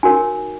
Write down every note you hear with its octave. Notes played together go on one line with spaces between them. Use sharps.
D#4 F#4 A#4 C#5 G#5